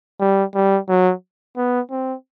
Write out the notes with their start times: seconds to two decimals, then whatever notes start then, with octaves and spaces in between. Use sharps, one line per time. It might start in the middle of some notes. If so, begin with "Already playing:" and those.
0.20 G3
0.55 G3
0.89 F#3
1.57 B3
1.91 C4